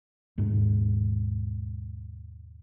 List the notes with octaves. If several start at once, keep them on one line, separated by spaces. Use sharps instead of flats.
D#2 G#2 B2